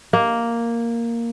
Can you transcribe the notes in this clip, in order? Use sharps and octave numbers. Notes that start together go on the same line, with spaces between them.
A#3